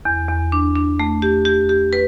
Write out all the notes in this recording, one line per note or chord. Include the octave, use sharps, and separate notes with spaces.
E2
E2
D4
D4
A3
G4
G4
G4
B4